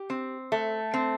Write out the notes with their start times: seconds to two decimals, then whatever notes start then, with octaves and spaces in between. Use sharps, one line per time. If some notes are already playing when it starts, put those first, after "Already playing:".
Already playing: G4
0.10 C4
0.52 A3
0.94 C4